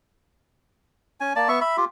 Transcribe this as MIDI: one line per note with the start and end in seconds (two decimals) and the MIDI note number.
1.20 1.33 61
1.20 1.33 80
1.36 1.48 58
1.36 1.48 74
1.36 1.48 81
1.48 1.60 59
1.48 1.60 76
1.48 1.60 85
1.61 1.77 76
1.61 1.77 83
1.77 1.85 65
1.77 1.85 67